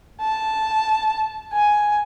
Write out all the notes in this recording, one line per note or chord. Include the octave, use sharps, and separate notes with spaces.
A5
G#5